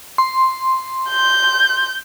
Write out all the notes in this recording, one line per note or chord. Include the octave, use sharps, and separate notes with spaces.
C6
G6